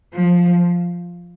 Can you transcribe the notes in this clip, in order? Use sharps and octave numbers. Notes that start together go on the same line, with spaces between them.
F3